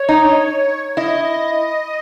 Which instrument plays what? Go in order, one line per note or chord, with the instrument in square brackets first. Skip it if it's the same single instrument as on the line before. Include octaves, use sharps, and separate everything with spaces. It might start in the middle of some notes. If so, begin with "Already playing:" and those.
Already playing: [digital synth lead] C#5
[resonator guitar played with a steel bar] D#4
[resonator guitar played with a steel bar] E4 [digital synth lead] D#5